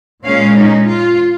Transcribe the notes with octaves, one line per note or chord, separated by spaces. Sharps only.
A#2 G#3 C#4 F5
D#4
F4